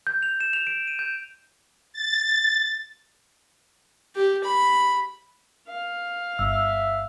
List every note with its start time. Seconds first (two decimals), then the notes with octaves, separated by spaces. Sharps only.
0.07 G6
0.23 F7
0.40 E7
0.53 F7
0.67 D7
0.87 D#7
0.99 G6
1.93 A6
4.16 G4
4.44 B5
5.68 F5
6.39 G1 E5 E6